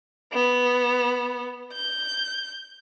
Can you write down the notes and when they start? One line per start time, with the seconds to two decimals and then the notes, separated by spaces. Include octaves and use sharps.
0.33 B3
1.73 G6